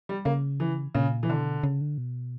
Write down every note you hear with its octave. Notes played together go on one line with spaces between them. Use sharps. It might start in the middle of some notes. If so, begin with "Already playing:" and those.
G3
C#3 A#3
E3
A#2 C#3
E3
B2 D3
C#3
D3
B2